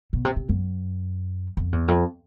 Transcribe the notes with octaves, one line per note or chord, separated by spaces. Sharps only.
B2
C3
C3
F#2
F2
E2
F2